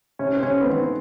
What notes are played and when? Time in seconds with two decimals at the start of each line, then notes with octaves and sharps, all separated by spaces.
0.19 C3 C#4
0.37 C4
0.43 C3 C#4
0.60 B3
0.65 D#3 C4